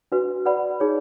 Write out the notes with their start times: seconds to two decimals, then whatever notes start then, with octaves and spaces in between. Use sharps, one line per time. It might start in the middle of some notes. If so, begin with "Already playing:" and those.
0.12 D4 F#4 B4
0.45 B4 D5 F#5 B5
0.80 D#4 G#4 C#5